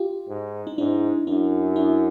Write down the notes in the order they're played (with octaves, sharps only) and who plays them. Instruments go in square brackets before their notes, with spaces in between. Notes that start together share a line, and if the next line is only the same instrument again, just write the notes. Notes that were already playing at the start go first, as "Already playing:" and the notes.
Already playing: [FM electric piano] F4 G4
[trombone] G#2
[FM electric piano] D#4
[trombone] G#2 [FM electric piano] D4 E4
[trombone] F#2 [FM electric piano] D4 E4
[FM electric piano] D4 E4